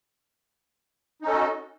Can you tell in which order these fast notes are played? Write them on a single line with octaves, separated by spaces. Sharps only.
D#4 C#4 A4 D#5 F#4